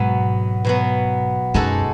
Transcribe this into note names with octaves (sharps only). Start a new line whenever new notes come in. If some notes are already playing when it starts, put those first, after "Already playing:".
Already playing: G#2 B2 F#3 B3
B2 F#3 B3
F#2 G#3 D#4 F#4 A4